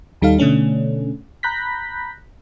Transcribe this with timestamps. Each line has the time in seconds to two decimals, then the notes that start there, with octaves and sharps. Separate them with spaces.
0.22 D#2 G3 D#4 A4 F5
0.39 B2 D3 A3 C#4 D4
1.43 A#5 B5 F#6 G6 A#6 B6